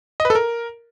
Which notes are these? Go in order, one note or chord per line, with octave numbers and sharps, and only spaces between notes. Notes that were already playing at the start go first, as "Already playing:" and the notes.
D#5
B4
A4
A#4